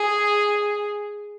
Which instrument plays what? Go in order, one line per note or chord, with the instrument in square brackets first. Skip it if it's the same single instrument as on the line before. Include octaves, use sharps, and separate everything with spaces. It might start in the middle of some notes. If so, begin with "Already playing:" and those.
Already playing: [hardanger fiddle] G#4